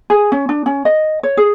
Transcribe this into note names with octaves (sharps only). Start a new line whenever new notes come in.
G#4
C#4
D4
C#4
D#5
C#5
G#4